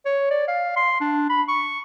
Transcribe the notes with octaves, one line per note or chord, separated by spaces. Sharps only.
C#5
D5
F5
C6
D4
B5
C#6